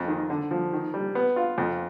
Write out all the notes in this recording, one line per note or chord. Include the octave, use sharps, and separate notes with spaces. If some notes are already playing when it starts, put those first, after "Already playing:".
Already playing: F2
D#3
D3
F3
D#3
G3
B3
F4
F2